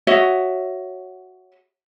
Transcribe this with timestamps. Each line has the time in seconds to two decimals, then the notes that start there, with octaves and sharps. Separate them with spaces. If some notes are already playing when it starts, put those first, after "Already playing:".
0.07 F#4 C#5 D#5 E5